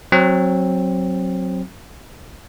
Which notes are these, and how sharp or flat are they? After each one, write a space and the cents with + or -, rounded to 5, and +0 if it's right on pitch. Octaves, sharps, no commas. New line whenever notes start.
F#3 +0 C4 +15